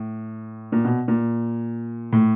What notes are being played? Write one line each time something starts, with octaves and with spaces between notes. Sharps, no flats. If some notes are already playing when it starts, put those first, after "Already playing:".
Already playing: A2
A#2
B2
A#2
A2